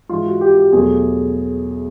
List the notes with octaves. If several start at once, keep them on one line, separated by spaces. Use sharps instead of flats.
G#2 E3 G#3 F4
F#4
G4
G4
E2 B2 F#3 A3 G#4